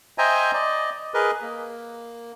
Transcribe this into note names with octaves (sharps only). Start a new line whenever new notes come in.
C5 D#5 E5 G5 G#5 A#5
D5 D#5
G#4 A#4 B4 D#5
A#3